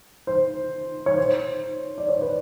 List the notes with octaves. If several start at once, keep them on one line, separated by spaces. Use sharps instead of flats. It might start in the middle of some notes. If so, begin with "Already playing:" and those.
C5
C#5
C5
D5
C#5
B4